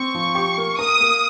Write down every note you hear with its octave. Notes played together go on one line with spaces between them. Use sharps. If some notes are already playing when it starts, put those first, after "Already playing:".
Already playing: C4 C#6
F3
G4
A#3
A#4 D#6
A#3